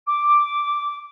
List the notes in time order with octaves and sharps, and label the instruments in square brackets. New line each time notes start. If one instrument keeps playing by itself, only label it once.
[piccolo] D6